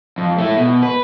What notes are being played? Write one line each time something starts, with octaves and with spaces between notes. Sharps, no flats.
F2
A3 E4
B2
B4